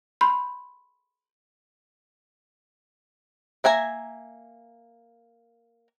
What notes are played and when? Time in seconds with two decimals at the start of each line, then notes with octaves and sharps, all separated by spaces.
0.21 B5 C6 G6
3.64 A#3 E5 G#5 A#5